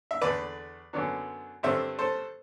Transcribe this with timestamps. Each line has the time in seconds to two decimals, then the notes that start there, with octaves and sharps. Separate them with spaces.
0.11 E5
0.22 E2 D3 A3 B4 D5
0.93 F#2 D3 F#3 B3 D4
1.63 G2 D3 A3 C4 C5 E5
1.99 A4 C5